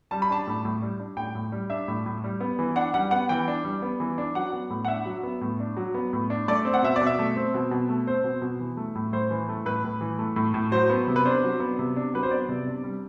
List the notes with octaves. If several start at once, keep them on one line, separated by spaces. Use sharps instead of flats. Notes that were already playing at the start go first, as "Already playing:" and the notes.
G3 A5
B5
D4 A5
A2
A2
G3
D4
A2 G5
A2
G3
D4 E5
A2
A2
G3
B3
E3
D4 F#5
G3 F#5
B3 F#5
E3 G5
D4
G3
B3
E3
D4
F#3 F#5
B3
A2
F#5
D4 E5
F#3
B3
A2
D4
F#3
B3
A2
D4
A3 D5
C4
F#5
B2 E5
D5
B2
E5
A3
C4
B2
B2
A3
C4 C5
B2
B2
E3
A3
A2
A2 C5
E3
A3
A2 B4
A2
E3
A3
A2
A2
F#3 C5
B3
C3
B4
D4 C5
F#3
B3
C3
D4
F#3 B4
C5
B3 D5
C3
D4
G3